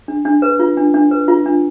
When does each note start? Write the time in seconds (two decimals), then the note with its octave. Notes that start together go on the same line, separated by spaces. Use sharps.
0.08 D4
0.25 D4
0.42 B4
0.59 F4
0.77 D4
0.94 D4
1.11 B4
1.28 F4
1.46 D4